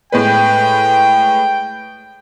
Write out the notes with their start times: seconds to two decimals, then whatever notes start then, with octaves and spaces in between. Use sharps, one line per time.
0.12 A2 G#3 B4 G5